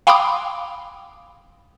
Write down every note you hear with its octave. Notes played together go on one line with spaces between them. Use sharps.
F5 G5 B5 C6 D6 D#6